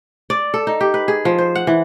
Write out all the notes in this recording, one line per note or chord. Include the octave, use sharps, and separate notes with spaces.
D5
A4
D#4
G4
B4
G#4
F3
C5
F#5
E3